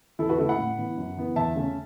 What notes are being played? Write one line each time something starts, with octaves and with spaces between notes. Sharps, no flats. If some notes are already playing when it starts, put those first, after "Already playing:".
E2 E4 A4
F#4 B4
C#3 A3 E4 A4
F#5 B5
A2
E3 B3
F#2
E3 B3
E2 E5 A5
C#3 A3 C#4